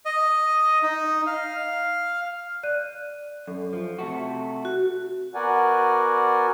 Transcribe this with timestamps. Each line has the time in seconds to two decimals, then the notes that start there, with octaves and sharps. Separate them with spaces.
0.06 D#5
0.83 D#4
1.27 F5
2.63 D5 F#6 D#7
3.48 F#2 A4
3.73 F3
3.98 C3 A3 F#4
4.65 F#4
5.35 B3 F#4 A#4 D5 F#5 G#5